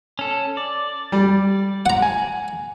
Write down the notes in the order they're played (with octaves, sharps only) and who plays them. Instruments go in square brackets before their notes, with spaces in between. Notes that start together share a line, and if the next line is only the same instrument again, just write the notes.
[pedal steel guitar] C#4 A4
D5
[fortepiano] G3
[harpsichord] F#5 A#5
[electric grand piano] G#5